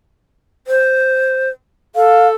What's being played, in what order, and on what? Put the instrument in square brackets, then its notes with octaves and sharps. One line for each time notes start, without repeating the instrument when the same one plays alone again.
[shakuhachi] C5
[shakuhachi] A4 [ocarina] F5